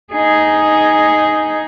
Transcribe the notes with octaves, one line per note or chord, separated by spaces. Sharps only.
D#4 G#4